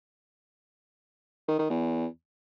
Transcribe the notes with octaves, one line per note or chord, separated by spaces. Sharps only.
D#3
D#3
E2